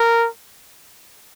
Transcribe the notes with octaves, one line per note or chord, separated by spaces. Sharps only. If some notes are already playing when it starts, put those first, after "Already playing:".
Already playing: A#4